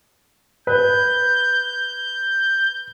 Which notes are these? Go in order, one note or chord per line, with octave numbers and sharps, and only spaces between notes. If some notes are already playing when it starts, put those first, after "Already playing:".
B4 G6